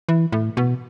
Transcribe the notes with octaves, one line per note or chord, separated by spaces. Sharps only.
E3
A2
B2